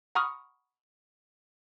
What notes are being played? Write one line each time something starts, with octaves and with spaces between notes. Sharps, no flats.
F#5 A#5 B5 C#6 D#6 F6